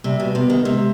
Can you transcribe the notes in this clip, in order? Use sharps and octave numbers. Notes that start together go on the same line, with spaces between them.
C3 G3
B2
C3 B3
D#3
C3 G#3